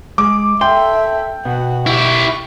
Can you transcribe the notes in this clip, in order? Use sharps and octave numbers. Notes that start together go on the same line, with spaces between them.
G#3 G#4 D6
A4 E5 G5 C6
B2 B3 F#4
E4 G4 C#6